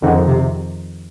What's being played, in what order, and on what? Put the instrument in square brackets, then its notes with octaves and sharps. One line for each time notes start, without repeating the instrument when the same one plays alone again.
[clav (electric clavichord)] F2 D#3 G#3 C4 D#4 [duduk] D3
[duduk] C3